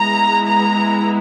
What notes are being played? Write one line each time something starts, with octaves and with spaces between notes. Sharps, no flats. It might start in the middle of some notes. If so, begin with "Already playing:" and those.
Already playing: G#3 B3 E4 A#5
A#5